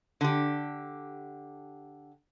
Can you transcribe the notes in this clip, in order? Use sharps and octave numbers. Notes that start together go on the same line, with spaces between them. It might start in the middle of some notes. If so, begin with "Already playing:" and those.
D3 G4